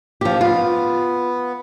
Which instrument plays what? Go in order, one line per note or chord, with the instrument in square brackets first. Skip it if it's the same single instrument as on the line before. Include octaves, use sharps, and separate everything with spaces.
[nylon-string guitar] F3 G4
[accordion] B3 [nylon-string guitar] F4